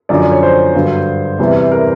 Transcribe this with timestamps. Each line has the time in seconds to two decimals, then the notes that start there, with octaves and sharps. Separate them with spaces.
0.09 F#2 D3 F3 D5
0.20 D5
0.31 C#5
0.43 C5
0.75 G2 D3 F#3
1.39 E2 C3 E3 G3
1.71 A#4